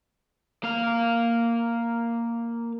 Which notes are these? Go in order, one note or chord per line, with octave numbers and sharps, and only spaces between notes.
A#3 F5